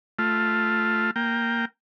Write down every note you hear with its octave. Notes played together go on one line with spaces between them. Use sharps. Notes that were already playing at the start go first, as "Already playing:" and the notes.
A3 F4
A#3 G5